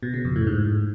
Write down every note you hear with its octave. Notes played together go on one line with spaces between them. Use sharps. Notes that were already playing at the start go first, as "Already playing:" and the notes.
B2
C#3
F2
A2
G#2